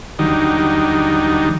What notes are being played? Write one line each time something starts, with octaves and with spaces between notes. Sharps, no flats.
D#2 D3 D#3 F#3 G3 D#4